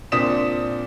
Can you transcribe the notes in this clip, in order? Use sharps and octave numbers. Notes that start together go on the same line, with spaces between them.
A#2 C4 D4 D#6 B6 E7